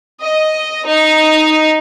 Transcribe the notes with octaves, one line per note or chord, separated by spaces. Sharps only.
D#5
D#4